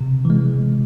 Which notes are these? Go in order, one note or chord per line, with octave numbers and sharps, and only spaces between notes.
C3
E3 G#3